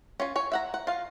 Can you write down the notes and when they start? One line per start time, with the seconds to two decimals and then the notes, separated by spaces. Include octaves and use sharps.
0.20 C#4 F4 G#5
0.36 C#5 G#5
0.52 E5 F#5 A#5
0.74 F#5
0.87 F4 F5